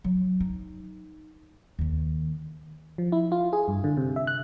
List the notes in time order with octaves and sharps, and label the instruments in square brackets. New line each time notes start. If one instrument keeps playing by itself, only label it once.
[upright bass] F#3
D#4
D#2 D#3
[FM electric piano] F3
E4
F4
G#4
G2
D3
C3
E5
F#6